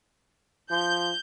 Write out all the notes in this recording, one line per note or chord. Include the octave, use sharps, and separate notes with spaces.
F3 G6